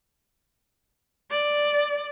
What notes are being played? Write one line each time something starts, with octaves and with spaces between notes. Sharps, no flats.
D5